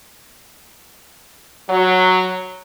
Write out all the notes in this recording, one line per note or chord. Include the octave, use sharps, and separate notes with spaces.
F#3